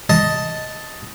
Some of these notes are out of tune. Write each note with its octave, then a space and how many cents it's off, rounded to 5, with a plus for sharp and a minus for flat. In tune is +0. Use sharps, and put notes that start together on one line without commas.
D#5 +10 A5 +0